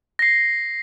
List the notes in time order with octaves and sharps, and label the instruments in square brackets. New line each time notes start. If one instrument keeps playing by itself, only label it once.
[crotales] A#6 C7